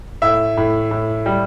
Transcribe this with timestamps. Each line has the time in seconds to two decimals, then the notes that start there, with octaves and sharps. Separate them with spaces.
0.22 A2 E5
0.57 A2
0.91 A2
1.26 G3